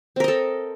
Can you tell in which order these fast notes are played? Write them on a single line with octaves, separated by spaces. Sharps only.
C4 A#4 D#5 A4